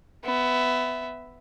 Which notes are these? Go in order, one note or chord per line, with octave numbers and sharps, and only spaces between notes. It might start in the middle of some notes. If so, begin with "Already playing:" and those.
B3 E5